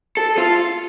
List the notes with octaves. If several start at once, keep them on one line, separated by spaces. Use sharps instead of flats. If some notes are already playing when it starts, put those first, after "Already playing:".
A4
F4